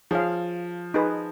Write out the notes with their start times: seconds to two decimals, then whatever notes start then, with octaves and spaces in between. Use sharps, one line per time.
0.11 F3 G#4 C#5 F5
0.94 D#4 G#4 B4